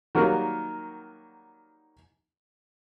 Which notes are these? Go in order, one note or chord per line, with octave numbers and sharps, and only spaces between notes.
D#3 F#3 G3 A#3 F#4 A#4